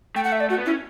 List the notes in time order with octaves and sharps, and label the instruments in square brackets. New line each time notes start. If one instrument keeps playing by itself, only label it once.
[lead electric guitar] A3 [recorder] G5
[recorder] F#5
E5
D5
[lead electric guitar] A3 [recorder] F#4
[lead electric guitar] B3
[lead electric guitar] C#4 [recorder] E4